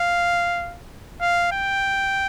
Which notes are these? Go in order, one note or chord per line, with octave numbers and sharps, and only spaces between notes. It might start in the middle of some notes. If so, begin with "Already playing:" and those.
Already playing: F5
F5
G5